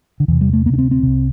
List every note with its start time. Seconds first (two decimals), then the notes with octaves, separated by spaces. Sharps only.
0.20 D3
0.28 E2 C3 E3
0.41 G3
0.53 A3
0.66 D2 A#3
0.69 C3 D4
0.78 C4
0.91 C4
1.03 C2 C3